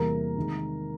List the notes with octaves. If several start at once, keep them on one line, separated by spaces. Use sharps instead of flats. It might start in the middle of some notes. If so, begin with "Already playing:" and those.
Already playing: E2 C3 E3 G3 A#3 A#4 A#5
C3 D#3 G#3